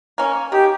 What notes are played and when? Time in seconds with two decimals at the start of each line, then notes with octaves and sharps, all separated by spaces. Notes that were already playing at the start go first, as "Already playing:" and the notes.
0.18 A#3 C#4
0.52 D#3 G4